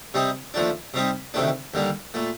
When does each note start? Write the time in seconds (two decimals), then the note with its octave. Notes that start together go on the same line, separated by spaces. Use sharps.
0.14 C3 G3 C4 D#4
0.54 D#2 D3 F3 A3 D4
0.94 C3 G3 C4 D#4
1.34 D2 C3 D#3 A3 D4
1.74 D#2 D3 G3 A#3
2.14 A#2 A3